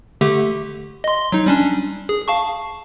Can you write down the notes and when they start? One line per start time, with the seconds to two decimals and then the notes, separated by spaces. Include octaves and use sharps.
0.21 D3 A3 G4
1.04 D#5 C6
1.32 F#3 D#4
1.46 G3 C#4 D4
2.09 G#4
2.28 F5 A5 C#6